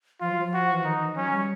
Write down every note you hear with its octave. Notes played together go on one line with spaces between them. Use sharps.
F3 F4
F#3
F3
F#4
E3
D#3 D#4
E3
F#3 C#4
G3